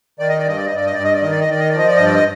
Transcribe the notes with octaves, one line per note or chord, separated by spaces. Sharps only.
D#3 D5
D#5
D5
G2 D#5
D5
D#5
G2 D5
D#5
G2 D5
D#5
D5
D#3 D#5
D5
D#5
D#3 D5
D#5
D5
F3 D#5
D5
G2 D#5
D5
D#5